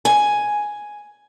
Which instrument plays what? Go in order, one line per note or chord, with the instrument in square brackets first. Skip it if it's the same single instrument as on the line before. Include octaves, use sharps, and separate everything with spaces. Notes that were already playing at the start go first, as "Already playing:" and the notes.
[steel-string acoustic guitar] G#5